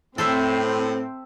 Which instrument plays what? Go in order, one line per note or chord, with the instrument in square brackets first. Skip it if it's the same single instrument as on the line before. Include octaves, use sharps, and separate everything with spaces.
[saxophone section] A2 [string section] C4 [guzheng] A4 C5 E5